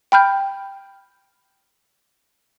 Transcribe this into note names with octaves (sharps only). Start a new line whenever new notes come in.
G5 B5 F6 G6